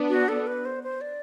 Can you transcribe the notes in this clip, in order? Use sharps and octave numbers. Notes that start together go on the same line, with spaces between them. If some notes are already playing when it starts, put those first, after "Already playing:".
Already playing: B3 D4
F#4
A4
B4
C5
C5
D5